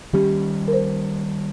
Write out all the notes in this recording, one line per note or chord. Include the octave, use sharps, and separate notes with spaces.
D#3 G3 C#4 G4
A#4
C5